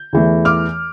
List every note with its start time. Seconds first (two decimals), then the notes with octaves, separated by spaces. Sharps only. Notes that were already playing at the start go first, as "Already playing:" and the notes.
Already playing: G6
0.13 E2 E3 A3
0.45 D6 F6